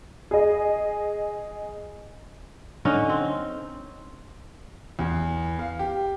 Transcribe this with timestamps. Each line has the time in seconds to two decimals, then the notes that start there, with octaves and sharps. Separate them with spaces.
0.31 G#4 D#5
2.85 D3 C#4 D#4
3.09 C4
4.99 E2
5.59 F5
5.79 G4